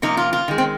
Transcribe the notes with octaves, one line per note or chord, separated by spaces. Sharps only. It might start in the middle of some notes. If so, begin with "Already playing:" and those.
C3 F3 A#3 D#4
F4
F4
D#3 G#3
C4